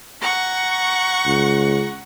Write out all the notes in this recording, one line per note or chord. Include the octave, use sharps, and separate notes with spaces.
F#5 A#5 C#6
C#2